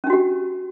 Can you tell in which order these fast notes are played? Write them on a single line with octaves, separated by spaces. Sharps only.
C#4 D4 F#4 G4